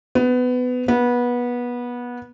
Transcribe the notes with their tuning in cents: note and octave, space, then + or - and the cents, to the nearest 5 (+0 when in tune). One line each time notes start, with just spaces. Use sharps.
B3 +20
B3 -20